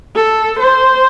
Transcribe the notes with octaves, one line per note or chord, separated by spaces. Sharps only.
A4
C5